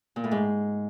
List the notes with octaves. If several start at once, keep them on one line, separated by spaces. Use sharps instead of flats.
A#2
A2
G#2